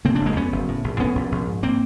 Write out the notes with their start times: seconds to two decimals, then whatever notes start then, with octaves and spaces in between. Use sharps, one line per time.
0.05 C#3 A#3 C4
0.15 C4 D4
0.21 F#1 G#3 A#3
0.36 F2 B3 C#4
0.52 F#1
0.68 A2
0.84 A#1
1.00 A2 B3 C#4
1.15 A#1
1.32 A#1
1.47 G#2
1.63 A#3 C4